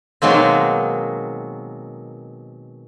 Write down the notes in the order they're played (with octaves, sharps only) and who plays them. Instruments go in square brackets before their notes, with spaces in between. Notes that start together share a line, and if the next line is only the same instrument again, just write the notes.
[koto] B2 D#3 F#3 G#3 A#3 C4